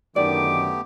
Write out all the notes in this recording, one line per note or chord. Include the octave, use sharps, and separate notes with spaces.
F#2 D3 D#3 A3 B3 G4 D5 D6